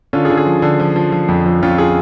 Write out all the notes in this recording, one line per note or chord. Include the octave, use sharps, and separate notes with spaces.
D3 C#4 F4
F4 G#4
D3
F4 G#4
F3
D3
F3
F3
F3
F2
F3
F2 C#4 F4
F4 G#4